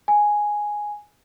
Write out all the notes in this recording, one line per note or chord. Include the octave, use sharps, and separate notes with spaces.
G#5